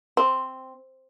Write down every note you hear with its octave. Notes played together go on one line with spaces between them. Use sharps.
C4